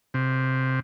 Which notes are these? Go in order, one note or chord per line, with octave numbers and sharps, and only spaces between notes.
C3